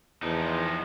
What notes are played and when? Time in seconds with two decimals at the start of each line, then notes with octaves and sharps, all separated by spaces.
0.22 E2 F3 D#4